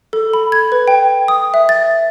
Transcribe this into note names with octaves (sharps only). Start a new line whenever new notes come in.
A4
B5
G#6
B4
G5
D#6
E5
A6